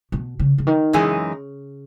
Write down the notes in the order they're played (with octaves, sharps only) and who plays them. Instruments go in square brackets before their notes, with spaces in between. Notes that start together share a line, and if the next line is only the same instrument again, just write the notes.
[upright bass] B2
C#3
C#3
D#3
[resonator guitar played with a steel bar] F#2 E3 G#3 D#4 G#4 [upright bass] C#3